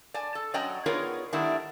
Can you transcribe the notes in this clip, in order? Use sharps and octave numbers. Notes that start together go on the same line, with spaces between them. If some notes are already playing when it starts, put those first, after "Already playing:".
D5 G#5 A5
A4
F#3 C#4 D5 D#5 G5 A#5
B3 D#4 F4 G#4 A#4 C#5
D#3 G3 A3 B3 D4 E4